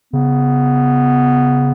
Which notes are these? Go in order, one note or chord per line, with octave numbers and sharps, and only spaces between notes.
C#3 B3